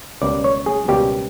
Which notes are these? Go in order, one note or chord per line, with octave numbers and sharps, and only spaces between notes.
C#2 B2 G3 A#3 D5
C#5
G#4
C#2 B2 G3 A#3 G4